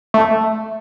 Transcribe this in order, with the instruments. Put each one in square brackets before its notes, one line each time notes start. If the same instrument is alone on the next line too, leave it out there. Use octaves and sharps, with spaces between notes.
[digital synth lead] A3